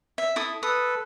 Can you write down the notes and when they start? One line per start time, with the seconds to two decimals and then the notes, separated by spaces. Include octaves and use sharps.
0.18 E5
0.36 E4 A4 D#6
0.63 A4 B4 D#6